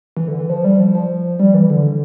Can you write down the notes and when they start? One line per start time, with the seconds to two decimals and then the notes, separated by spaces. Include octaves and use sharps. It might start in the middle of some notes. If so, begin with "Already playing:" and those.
0.17 E3
0.28 D3
0.39 E3
0.50 F3
0.64 G3
0.80 F3
0.95 F3
1.39 G3
1.54 E3
1.70 D3